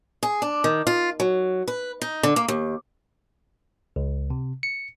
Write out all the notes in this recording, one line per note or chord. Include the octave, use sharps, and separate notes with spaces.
G#4
D4
D#3
F4
F#3
B4
D#4
D3
A#3
D#2
C#2
C3
C#7